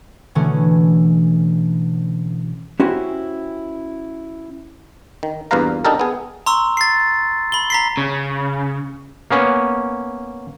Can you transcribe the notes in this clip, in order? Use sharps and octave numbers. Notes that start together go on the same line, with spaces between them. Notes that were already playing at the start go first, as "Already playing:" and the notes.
B2 D3 E3 A3 C#4
C#4 E4 F#4 G4 C5
D#3
E2 G2 A#2 B4 F5 A#5
D4 D#4 G4 A4 A#4
B3 G#4
A#5 C6 C#6 E6
A6 C7
B5 G7
A#5 B6 C7
C#3
A#3 B3 C#4